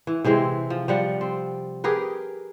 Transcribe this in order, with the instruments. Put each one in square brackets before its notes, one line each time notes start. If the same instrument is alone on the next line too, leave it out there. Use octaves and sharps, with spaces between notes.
[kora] E3
C3 E3 G#3 C4
F3
F3 G3 F#5
C4
G4 G#4 A#4 B4